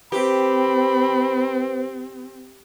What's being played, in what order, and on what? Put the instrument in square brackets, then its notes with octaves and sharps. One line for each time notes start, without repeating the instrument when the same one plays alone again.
[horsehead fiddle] C4 [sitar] G4 [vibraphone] B4 C5 [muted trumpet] B5